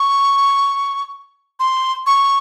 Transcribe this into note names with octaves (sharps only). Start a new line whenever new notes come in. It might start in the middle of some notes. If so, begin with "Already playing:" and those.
Already playing: C#6
C6
C#6